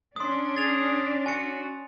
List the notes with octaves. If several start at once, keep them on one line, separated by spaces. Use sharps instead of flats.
C#4 D4 C6 D#6
G#4 A6 F7
F#4 G#5 C#7